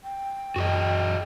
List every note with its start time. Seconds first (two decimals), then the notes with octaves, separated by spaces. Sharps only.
0.04 G5
0.56 F#2 F#4 G#4 D#5